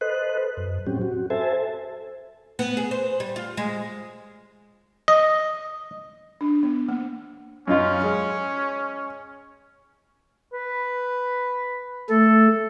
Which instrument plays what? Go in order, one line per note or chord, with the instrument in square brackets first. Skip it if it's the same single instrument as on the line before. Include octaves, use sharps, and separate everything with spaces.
[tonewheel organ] A4 B4 C5 D#5 F#6
F#2
A2 F#3 C4 C#4 G4
F#4
A4 C5 E5 G#5 A5
[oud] B3
G#4
C5
G3
F4
G#3
[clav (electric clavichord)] D#5
[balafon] D4
B3
A#3
[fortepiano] F#2 D#4 F4 [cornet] C#4
[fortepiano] G#3
[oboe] B4
[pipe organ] A3 [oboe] A4